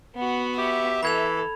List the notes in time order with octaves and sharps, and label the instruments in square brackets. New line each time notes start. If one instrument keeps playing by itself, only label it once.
[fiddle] B3 F#4
[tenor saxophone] G4 [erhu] E5
[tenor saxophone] E3 [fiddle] A4 [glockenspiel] B5 G#6 F7